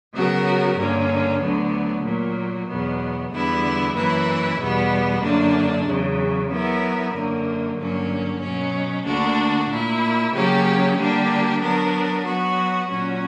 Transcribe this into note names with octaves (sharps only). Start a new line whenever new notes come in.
C#3 F#3 B3 F#4 A#4
G2 D3 A#3 C#4
D2 D3 F#3 B3
A#2 F#3 A#3
E2 B2 F#3 B3
E2 D3 G3 B3 E4
F#2 E3 A#3 E4 B4
E2 B2 G3 B3
F#2 D3 A#3 D4
E2 C#3 F#3
F#3 B3 E4 A#4
F#2 D3 F#3 A#3
G2 D3 F#3 A#3 C#4
B2 F#3 C#4
D2 D3 A#3 D4 F#4
A#2 A#3 E4
C#3 F#3 A#3 C#4 G4
D3 G3 A#3 D4 G4
F#3 B3 D4 A#4
F#3 B3 F#4
A#2 F#3 C#4 F#4